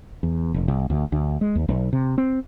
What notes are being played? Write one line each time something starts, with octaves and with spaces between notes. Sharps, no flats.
E2
F1
C2
D2
D2
G#3
D#2
B1
C3
C4